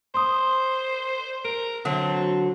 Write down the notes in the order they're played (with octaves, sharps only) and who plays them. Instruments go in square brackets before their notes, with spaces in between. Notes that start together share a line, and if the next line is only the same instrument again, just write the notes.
[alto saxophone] C5 [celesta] C6 D#6
[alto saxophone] A#4 [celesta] D7
[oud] D3 F#3 [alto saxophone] C4